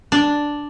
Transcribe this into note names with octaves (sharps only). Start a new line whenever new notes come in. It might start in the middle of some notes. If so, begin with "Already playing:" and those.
D4